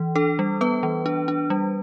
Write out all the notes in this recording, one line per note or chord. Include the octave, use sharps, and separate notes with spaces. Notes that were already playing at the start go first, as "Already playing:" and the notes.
Already playing: E3
D4 A4
G3
B3 B4
E3
D4
D4
G3